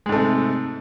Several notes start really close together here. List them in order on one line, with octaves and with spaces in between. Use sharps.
G#3 G#2 A3 C3